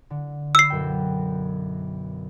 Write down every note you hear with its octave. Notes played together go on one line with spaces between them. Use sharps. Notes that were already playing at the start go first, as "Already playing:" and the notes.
D3
B5 E6 C7 E7
B1 F#2 G5